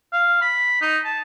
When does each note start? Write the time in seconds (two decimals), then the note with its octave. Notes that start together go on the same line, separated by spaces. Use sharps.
0.13 F5
0.42 B5
0.82 D#4
1.05 A5